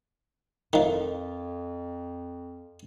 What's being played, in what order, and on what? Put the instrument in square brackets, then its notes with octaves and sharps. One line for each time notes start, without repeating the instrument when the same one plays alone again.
[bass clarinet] F2 [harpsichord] D#3 F3